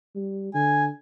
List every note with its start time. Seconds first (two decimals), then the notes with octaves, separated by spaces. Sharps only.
0.15 G3
0.54 D3 G#5